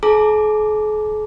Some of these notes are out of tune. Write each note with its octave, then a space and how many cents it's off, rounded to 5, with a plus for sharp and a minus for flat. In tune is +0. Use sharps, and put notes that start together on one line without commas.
G#4 +45 A#5 -25 D6 +0